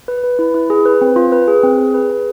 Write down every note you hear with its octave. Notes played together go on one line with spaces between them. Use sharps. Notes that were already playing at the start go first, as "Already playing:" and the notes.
B4
B4
E4
E4
G#4
B4
C4
F4
B4
G#4
C4
G#4
B4
G#4